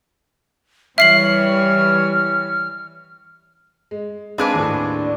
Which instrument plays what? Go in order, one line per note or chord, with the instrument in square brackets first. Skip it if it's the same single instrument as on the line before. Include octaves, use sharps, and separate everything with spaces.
[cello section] E3 G3 C#5 [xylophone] E5 C7 F#7 [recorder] F6
[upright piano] G#3
[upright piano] G#3 F5 D7 [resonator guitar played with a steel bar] C4 G#4 B4 [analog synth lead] D4
[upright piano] D#2 A2